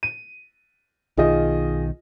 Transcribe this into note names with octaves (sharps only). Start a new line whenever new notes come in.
D#7
B1 D#3 F4 G#4 D#5